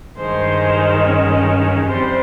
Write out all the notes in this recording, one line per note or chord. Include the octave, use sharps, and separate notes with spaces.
G2 D#3 G#3 C5
C#4
F2 C3 G3 C5